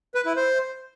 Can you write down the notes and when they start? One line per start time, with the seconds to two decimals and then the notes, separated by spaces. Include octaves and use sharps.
0.15 B4
0.26 E4
0.36 C5